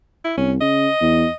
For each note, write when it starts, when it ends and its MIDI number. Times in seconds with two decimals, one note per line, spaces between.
0.25 0.35 64
0.37 0.58 36
0.37 0.52 61
0.61 0.88 49
0.61 1.34 75
1.01 1.25 40